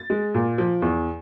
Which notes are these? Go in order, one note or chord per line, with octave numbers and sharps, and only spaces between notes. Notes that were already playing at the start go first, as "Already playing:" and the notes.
Already playing: A6
G#3
A#2
F3
E2